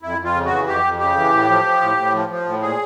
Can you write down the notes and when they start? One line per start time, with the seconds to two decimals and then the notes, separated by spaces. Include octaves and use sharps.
0.02 F2 E4
0.19 F2
0.24 F4
0.34 C#3
0.46 F#4
0.51 E3
0.67 F2 G4
0.83 F2
0.99 C#3 G4
1.16 E3
1.32 A2
1.49 F3
1.65 F3
1.81 A2
1.97 A2
2.13 F3
2.29 F3
2.46 A2
2.62 A#2 G#4